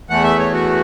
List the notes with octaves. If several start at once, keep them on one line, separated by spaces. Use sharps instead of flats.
E2 E3 A3 F#5
E5
C#5
F#4